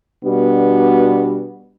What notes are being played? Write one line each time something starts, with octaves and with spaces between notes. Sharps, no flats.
B2 G3 B3 D4 F#4